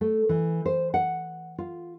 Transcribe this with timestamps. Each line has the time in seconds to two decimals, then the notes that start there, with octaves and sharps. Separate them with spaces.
0.01 A3
0.29 E3
0.66 C5
0.94 F#5
1.58 F4